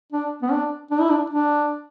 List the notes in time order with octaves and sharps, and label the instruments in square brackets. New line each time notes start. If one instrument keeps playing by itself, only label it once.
[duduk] D4
B3
D4
D4
E4
D4
D4